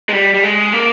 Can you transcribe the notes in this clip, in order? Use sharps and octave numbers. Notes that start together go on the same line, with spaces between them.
G#3
G3
G3
G#3
A#3